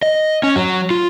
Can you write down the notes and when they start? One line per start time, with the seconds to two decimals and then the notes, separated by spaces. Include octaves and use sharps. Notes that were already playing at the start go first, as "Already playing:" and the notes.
0.02 D#5
0.43 C#4
0.56 F#3
0.91 F4